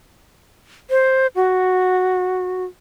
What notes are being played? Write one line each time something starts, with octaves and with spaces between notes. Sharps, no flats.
C5
F#4